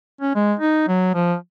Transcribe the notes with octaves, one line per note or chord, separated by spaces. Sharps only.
C#4
G#3
D#4
F#3
F3